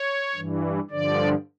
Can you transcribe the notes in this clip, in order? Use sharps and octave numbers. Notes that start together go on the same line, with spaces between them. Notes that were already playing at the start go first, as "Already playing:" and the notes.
Already playing: C#5
G2 E3
G2 D3 F3 D5